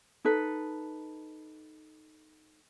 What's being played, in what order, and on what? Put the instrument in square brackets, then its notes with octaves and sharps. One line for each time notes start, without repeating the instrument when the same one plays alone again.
[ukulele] D#4 A4 B4